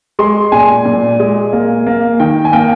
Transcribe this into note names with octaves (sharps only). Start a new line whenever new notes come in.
G#3 C6
A#2 G#5
A#2
G#3
A#3
A#3
D#3 G5
G#5
A#3 G5